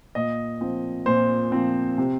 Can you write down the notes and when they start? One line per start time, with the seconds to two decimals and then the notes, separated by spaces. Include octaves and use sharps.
0.15 A#2 D#5
0.61 F3 C4
1.06 A#2 C5
1.52 F3 C4
1.98 C3